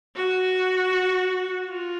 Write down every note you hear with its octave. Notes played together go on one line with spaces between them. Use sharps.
F#4
F4